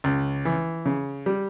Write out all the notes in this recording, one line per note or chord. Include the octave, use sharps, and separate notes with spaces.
C#2
E3
C#3
G3